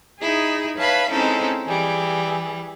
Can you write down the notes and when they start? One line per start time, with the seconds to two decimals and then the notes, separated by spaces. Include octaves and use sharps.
0.20 D#4 E4 G#4
0.77 B4 C#5 E5 F5 A5 B5
1.11 G#3 C4 C#4 D#4 E4 A4
1.66 E3 G3 G#4